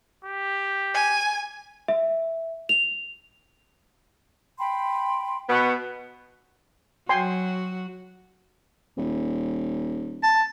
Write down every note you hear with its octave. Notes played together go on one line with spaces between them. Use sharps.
G4
G#5
E5
F7
G5 B5 C6
B2 B3 C#6
F#3 F#4 G5 G#5 C6
D#1
A5